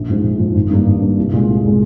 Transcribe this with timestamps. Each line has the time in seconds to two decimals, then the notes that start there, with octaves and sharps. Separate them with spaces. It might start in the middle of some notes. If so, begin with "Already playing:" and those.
Already playing: A#1
0.09 G#2 F3 G#3
0.24 A#1
0.39 G#2 F3 G#3
0.55 G#1
0.70 G2 G3 A#3
0.86 G#1
1.01 G2 G3 A#3
1.18 C2
1.33 A#2 G#3
1.49 C2
1.65 A#2 G#3